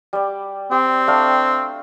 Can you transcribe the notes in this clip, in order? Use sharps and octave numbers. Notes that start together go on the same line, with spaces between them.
G3 D5
C4 G4
A3 D4 F5